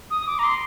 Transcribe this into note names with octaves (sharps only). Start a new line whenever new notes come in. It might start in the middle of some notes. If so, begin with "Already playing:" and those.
D#6
D6
A#5
C6